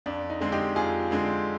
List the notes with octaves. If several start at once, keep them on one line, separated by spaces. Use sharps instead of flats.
F2 D4
D#4
D3 G#3 C4
D#4 G4
F2 F4 G#4
D3 G#3 C4